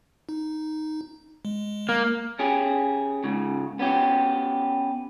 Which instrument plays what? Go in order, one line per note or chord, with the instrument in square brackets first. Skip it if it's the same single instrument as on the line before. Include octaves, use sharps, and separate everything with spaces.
[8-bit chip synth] D#4
G#3
[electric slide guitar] A#3
[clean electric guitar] C#4 G4 G#4
G#2 C#3
B3 C#4 G4